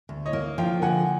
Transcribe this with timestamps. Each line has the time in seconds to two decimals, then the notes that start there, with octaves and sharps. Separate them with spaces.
0.09 D2
0.26 C#5 D#5
0.33 A#3
0.58 F3 F5 G5
0.82 D3 F#5 G#5